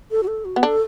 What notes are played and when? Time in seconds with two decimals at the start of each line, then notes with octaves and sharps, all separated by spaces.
0.11 A4
0.23 F#4
0.27 A4
0.45 F#4
0.56 B3
0.63 D4 A4